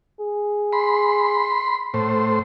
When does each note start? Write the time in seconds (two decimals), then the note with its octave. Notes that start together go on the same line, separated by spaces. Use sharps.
0.20 G#4
0.73 B5 C6
1.94 A2 C5